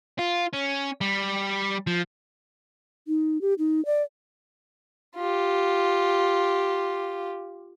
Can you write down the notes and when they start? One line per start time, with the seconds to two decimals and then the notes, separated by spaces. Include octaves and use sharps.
0.19 F4
0.54 C#4
1.01 G3
1.87 F3
3.08 D#4
3.41 G4
3.59 D#4
3.86 D5
5.17 F4 G4